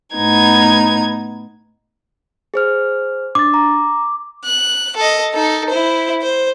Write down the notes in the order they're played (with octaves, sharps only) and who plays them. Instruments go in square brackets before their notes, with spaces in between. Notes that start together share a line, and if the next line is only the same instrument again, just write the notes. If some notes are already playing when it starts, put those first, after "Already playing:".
[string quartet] A2 B3 D#4 G#6
[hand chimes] G#4 C5 F6
[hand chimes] D4 A6 [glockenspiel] D6
[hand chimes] A#5
[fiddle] F#6
A4 D#5
D#4 A4
E4 C5
C5